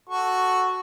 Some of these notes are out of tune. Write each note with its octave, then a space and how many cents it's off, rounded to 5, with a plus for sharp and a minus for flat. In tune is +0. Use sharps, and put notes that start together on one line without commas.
F#4 +0 A4 +0 C#6 +0